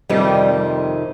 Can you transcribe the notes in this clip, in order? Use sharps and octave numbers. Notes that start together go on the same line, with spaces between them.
F2 C3 D#3 G3